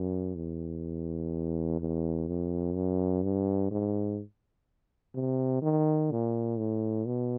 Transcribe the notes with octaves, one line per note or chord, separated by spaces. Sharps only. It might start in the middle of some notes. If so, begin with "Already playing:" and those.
Already playing: F#2
E2
E2
F2
F#2
G2
G#2
C3
D#3
A#2
A2
B2